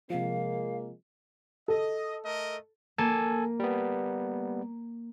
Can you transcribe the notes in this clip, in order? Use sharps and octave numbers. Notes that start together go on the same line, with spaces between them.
C3 F3 G#3 A#3 F5
A4 D#5
A3 A#4 D#5
A#3 A4 G#5 A5
G3 B3